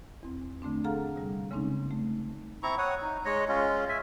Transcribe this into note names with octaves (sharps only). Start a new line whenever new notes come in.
E2 C4
D3 A3 C4 D4
G#4 A4 F5 F#5 A#5 F6
C3 G3
C#3 G#3 A#3 C4 C#4 D#4
A3
C4 E4 A#5 C#6
C#5 F#5 D#6
D#4
G#3 C#5 D#5
G#3 C#4 F4
E5 G#5